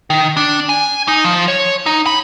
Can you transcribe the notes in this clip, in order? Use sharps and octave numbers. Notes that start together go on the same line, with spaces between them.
D#3
D4
G#5
D#4
F3
C#5
D#4
B5